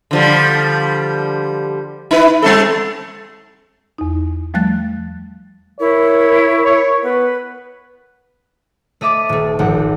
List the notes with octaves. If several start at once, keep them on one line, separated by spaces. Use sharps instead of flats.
D3 F3 G3
D#4 E4 B4
G3 C4 A4
E2 D#4
F3 G3 A3 F#6 A6
E4 A#4 C#5
C#5
B3 B4
A3 D#5 E5 D6 A6
D#1 A3
G#1 F3 A3 F#5